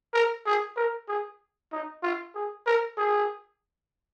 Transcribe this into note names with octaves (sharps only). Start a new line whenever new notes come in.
A#4
G#4
A#4
G#4
D#4
F4
G#4
A#4
G#4